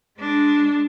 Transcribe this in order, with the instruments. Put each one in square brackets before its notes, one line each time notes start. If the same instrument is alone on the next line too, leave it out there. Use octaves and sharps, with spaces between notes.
[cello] G#3 D4